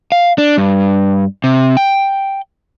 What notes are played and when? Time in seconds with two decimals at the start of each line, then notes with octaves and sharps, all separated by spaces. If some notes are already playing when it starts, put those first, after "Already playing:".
0.12 F5
0.38 D4
0.58 G2
1.44 C3
1.77 G5